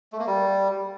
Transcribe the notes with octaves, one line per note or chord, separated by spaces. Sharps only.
A3
A#3
G3